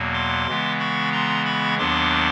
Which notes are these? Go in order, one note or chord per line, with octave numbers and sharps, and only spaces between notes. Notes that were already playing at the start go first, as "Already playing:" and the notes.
Already playing: E2 B2 F#3 A#3
C6 D6
C#3 E3 G#3 B3
B5 C#6
A#5 C6
B5 C#6
D#2 D#3 F#3 B3 D4 C6 D6